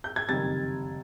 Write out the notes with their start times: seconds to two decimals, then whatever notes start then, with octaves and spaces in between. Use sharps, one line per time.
0.04 G6
0.16 G#6
0.29 F#1 F2 C3 D#3 G3 A6